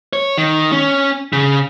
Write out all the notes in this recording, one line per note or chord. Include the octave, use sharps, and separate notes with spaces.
C#5
D#3
C#4
C#3